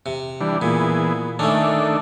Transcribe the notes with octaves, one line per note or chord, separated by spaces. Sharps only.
C3
E3 G3 D4
A#2 E3 B3 G#4
D#3 A3 C#4 D4 A4